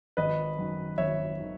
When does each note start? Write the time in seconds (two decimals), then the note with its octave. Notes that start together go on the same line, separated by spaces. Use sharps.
0.17 G#1 B4 D#5
0.57 F#2 D#3
0.98 G#1 C#5 E5
1.40 D#3